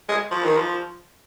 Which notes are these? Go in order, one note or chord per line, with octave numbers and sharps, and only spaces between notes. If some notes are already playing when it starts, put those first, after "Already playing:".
G#3
F3
D#3
F3